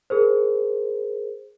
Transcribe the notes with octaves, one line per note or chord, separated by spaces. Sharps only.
G#4 A#4 C5